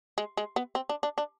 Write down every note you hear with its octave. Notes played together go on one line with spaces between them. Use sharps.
G#3
G#3
B3
C4
D4
D4
D4